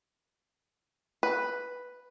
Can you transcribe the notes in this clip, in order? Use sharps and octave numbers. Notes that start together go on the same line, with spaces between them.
B4